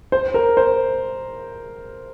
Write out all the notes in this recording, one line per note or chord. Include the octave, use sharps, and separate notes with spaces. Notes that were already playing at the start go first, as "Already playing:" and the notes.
C5
A#4
C5